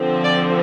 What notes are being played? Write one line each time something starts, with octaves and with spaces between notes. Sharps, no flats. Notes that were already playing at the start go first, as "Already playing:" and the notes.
Already playing: D3 F3 C4
D5